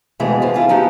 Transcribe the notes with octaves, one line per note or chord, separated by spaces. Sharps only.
F2 B2 E3 G#3 A3
F3 G#3
E4 F4 G#4
F3 D#4 E4 F#4 G4